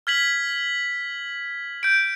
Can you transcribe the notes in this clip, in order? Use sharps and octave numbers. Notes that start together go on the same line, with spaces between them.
F6 G#6 B6 F#7
G6 D7